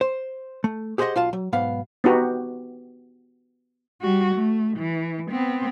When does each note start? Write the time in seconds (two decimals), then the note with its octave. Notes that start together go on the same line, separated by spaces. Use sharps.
0.01 C5
0.64 A3
0.98 G4 G#4 C5 D5 D#5 F#5
1.16 B1 F4 F5 A5
1.33 F#3
1.53 B1 G#2 B3 F5
2.04 B3 D#4 F#4 G4
4.01 G3 F#4
4.35 A3
4.78 E3
5.31 B3 C4